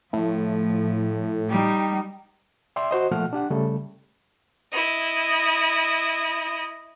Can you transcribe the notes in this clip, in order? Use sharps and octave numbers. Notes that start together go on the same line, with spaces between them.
A2 F3
G3 D#4 G5
D5 E5 G5 C6
F#4 C5 D#5
A#2 F3 A3 F#5 F6
D4 G4 F#5
C#3 G3 A3 A4
E4 D#5